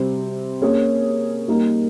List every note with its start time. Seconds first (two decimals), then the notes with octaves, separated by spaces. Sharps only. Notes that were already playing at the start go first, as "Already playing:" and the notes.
Already playing: C3 G3 C4
0.62 A#3 C#4 G#4 C#5
1.48 G3 A#3 D#4 A#4